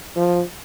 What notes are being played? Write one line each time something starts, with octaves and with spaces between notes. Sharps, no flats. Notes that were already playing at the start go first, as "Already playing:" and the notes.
F3